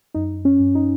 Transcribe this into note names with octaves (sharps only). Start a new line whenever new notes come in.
F#2 D#4
C#4
F#2
D#4